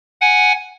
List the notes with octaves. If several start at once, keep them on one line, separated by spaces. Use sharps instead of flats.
F#5 G#5